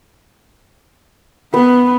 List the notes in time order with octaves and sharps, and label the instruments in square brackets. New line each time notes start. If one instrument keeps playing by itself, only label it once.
[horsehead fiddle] B3 [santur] B4